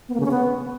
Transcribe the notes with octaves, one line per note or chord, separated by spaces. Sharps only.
B3
A#3
C#3
C#4
B3